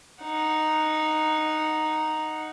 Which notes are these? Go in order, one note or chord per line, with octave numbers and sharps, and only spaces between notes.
D#4 F#5